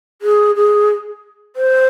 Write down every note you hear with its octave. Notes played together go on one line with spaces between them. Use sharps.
G#4
G#4
C5